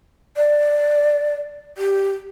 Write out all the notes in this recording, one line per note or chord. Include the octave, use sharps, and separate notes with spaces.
D5
G4